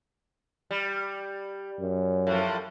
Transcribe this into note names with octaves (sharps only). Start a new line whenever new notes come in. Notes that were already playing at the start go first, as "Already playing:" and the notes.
G3
F#2
A2 F3